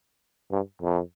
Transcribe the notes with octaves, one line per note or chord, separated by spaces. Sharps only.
G2
F2